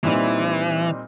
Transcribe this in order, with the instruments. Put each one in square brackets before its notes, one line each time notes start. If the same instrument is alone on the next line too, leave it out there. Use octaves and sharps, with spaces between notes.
[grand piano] A#2 G3 C4 D#4 [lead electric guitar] E3